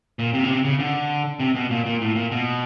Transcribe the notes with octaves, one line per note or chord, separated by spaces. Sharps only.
A#2
C3
C#3
C3
C#3
D3
C3
B2
A#2
A#2
A2
A#2
B2